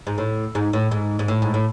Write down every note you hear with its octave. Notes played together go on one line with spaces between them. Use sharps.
G#2
A2
G#2
A2
G#2
G#2
A2
G#2
A2